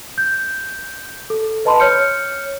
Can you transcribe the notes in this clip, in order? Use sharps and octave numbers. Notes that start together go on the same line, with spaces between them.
G6
A4
B4 D#5 A5 B5 C6
C#5 F6 G6 C#7